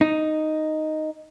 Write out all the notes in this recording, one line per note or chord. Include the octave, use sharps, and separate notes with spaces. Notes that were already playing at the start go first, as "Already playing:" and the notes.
D#4